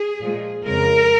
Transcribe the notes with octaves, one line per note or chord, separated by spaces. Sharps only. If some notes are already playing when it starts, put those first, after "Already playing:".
Already playing: G#4
A#2 F3 G#3
F2 C#3 G#3 A#4